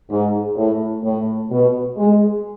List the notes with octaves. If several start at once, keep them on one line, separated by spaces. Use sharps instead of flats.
G#2
A2
A2
B2
G#3